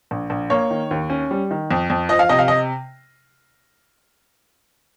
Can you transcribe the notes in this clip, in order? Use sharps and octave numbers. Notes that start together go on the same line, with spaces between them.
A#1
A#1
A#3 C#5
D#3
D#2
C#4
G3
D#3
F2
F2
F3 D#5
F5
C3 D#5
F5
D#5